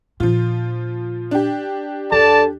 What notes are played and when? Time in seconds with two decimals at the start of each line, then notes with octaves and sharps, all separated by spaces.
0.20 A#2 D3 F3 F4
1.31 D4 G4
2.12 E2 A4 D5 A5